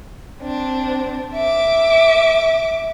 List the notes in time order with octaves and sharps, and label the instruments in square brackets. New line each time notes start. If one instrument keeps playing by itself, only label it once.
[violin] C4 D4
E5 D6